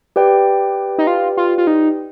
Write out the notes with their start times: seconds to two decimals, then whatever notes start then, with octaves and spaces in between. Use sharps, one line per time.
0.16 G4 B4 D5 G5
0.98 D#4
1.07 F4
1.37 F4
1.58 F4
1.67 D#4